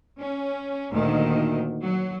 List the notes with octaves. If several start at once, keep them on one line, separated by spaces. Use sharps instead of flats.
C#4
D2 A#2 D#3
F#3